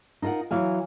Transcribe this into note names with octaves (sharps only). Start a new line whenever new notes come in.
D#4 F4 A4 A#4 F#5
E3 F#3 F5 G#5